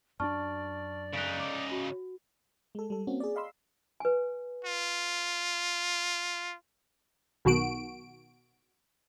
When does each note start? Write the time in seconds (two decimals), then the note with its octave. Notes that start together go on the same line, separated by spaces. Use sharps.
0.20 F#2 C#4 D4 D5 A5 C#6 F6
1.14 C#3 D#4 F#6 B6 D7
1.40 D6 D7
1.71 F#4
2.75 G#3 A4
2.90 G3 A4
3.07 A#3 C4 C#4 F#4
3.20 G#4 D5
3.35 D#5 F5 B5 C6 E6
4.00 B4 G#5
4.65 F4
7.45 B1 B2 D#3 F#4 D7